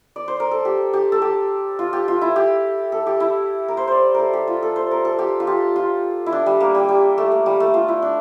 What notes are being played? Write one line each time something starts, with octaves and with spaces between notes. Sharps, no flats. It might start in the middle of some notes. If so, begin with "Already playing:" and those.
D5
C5
A#4
A4
G4
G4
A4
G4
F4
G4
F4
E4
G4
A4
G4
E4
A#4
C5
C5 D5
A4 A#4
G4
F4
A4
C5
A#4
A4
G4
F4
G4
F4
E4
D4
G3
A#3
G3
G3
A3
A#3
G3
A3
F4
E4
D4